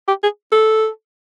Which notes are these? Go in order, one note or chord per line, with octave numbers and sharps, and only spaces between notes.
G4
G#4
A4